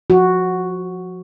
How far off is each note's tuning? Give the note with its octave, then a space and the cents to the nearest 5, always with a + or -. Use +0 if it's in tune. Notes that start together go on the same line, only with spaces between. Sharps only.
F3 +25 F#4 +0